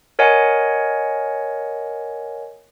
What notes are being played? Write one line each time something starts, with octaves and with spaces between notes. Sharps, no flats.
A#4 C#5 D#5 F#5 G#5